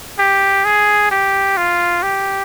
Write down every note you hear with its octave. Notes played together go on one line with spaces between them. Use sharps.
G4
G#4
G4
F4
G4